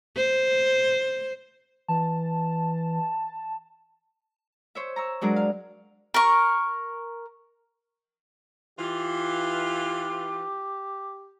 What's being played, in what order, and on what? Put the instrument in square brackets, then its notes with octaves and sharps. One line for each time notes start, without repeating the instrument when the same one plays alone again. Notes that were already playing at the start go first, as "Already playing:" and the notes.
[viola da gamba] C5
[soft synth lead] E3 [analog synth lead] A5
[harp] C5 C#5 E5
A#5 C#6 E6
F#3 G#3 D4 G#4 A#4
F5
[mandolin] A#4 C#6
[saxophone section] E3 F4 [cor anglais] G4